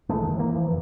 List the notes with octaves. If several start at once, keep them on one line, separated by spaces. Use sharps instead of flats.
B1 E3 G#3 A3
F1 D#3
E3 F3 A#3
E3 F3
F1 E3